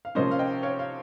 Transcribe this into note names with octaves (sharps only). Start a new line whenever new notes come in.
F5
C3 F3 A#3 C#4 C5 D#5
F5
D#5 G5
C#5 F5
F5